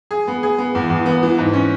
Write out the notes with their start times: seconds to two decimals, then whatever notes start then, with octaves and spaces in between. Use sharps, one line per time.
0.11 G#4
0.28 B3
0.43 G#4
0.58 B3
0.75 E2
0.90 E2
1.06 B3
1.23 E3
1.38 G#2
1.53 C#4